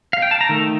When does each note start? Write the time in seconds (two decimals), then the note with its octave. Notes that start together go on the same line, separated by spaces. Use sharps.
0.13 F5
0.22 G5
0.31 A5
0.41 A#5
0.49 D#3 A3